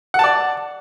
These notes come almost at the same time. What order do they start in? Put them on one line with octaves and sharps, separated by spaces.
F#5 A5 D5